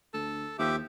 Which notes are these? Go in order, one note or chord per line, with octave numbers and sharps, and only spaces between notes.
D2 A4
D#2 F3 G4 E5 D6